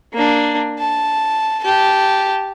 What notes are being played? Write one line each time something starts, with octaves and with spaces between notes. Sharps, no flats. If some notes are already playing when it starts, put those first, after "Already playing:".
A#3 D4
A5
G4 A5